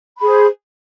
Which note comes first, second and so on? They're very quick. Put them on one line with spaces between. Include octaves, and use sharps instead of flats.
B5 G#4 C5